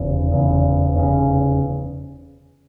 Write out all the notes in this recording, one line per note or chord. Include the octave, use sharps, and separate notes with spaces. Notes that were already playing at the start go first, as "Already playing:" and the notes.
Already playing: F1 E2 C#3
F1 E2 C#3
F1 E2 C#3